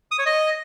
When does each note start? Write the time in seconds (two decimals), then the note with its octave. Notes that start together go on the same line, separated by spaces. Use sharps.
0.11 D#6
0.19 C#5
0.26 D#5